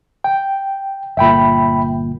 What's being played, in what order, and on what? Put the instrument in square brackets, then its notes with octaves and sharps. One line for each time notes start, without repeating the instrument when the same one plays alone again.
[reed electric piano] G5
[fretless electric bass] G1 A#2 [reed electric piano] E5 G5 B5